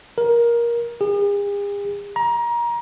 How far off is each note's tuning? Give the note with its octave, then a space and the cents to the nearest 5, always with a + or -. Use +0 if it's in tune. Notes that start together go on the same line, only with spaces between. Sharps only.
A#4 +15
G#4 -45
A#5 +25